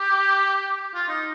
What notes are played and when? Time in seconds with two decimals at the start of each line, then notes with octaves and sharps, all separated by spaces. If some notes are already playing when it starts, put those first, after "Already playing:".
Already playing: G4
0.95 F4
1.08 D#4